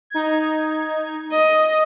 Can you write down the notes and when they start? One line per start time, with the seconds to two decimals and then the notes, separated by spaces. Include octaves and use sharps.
0.10 D#4 G#6
1.31 D#5